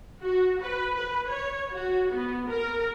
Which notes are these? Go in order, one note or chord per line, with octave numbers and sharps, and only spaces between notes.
F#4
B4
B4
C#5
F#4
B3
A#4